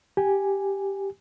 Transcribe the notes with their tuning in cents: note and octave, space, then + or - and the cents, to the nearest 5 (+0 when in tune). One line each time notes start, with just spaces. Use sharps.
G4 +0 G#5 +0